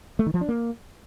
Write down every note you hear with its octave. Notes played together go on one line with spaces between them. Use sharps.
A3
D#3
F3
D4
A#3